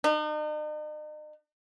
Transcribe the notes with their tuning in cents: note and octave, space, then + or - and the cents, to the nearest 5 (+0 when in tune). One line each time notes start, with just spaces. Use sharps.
D#4 -40